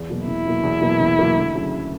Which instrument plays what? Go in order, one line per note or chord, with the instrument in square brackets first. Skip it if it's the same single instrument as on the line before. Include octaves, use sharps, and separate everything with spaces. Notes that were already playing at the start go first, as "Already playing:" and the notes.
Already playing: [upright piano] E2
B2 F#3 A#3
[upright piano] E2 [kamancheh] E4
[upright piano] B2 F#3 A#3
E2
B2 F#3 A#3
E2
B2 F#3 A#3
D2
C#3 F#3 A3